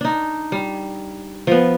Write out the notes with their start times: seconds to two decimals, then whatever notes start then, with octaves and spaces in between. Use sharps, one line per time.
0.01 D4 D#4
0.52 G3
1.47 F3 B3